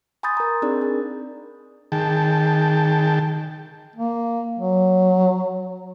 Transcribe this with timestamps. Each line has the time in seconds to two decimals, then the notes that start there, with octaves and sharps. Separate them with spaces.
0.23 G#5 B5 C6 D#6 G6 A6
0.37 A#4 A#5
0.62 C4 D4 D#4 G#4 A#4 D5
0.81 A#4
1.92 D#3 G#4 G5 A5
3.96 A#3
4.59 F#3